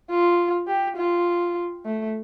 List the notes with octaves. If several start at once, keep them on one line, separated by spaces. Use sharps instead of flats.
F4
G4
F4
A3